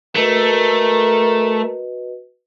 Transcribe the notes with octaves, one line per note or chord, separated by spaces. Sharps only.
A3 F#4 A#4 B4 D#5